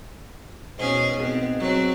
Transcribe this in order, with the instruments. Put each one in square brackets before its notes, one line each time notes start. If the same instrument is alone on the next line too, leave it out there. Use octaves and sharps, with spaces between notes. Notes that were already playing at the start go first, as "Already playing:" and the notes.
[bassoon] G#2 [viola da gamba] B2 C#4 G#4
[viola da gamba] B3 C4
F#3 C4